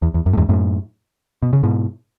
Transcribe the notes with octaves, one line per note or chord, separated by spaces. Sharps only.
E2
E2
F#2
A2
E2 G#2
F#2 A2
B2
C#3
G#2 B2